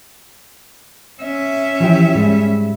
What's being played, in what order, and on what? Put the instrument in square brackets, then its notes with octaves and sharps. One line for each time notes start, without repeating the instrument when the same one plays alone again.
[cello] C#4 E5
[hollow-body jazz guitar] E3 F3 G4
G#2 G3 G#3